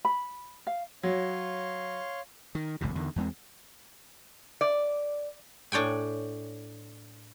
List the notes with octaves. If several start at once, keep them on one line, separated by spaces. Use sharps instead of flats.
B5
F5
F#3 C#5 F5 C6
D#3
F#1 C#2 A2 C3
E2 D3 D#3
E2 G#3 C4
D5
A2 D4 C#5 G5 G#5